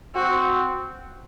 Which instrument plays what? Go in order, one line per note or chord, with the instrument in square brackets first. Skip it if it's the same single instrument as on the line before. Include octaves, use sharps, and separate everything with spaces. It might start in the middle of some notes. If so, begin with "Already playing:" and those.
[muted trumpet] C4 [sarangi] F#4